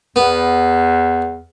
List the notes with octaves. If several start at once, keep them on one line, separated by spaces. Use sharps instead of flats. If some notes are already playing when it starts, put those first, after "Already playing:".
E2 B3